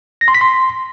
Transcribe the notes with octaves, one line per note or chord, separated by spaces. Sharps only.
A#6
C6
B6
C6